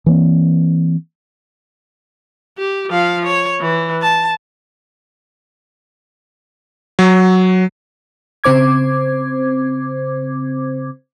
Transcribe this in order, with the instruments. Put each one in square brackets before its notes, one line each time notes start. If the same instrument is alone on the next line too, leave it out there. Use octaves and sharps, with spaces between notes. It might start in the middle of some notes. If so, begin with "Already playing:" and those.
[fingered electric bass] E3 A#3 C4
[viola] G4
F3 F5
C#5
E3
A5
[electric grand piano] F#3
[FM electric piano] C#3 C4 C5 D6 G#6